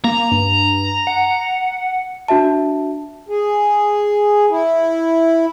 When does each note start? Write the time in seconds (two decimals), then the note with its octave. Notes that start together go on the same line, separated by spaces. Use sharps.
0.04 A#3 A#5
0.31 G2
1.07 F#5
2.28 D4 F#4 E5 A5
3.29 G#4
4.50 E4